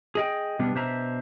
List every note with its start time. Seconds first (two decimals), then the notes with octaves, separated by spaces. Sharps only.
0.15 G#4 D#5 G5
0.59 B2 G3 B3 D4
0.75 B2 D4 C5 E5 A#5